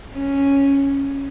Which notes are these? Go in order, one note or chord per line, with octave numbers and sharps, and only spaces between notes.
C#4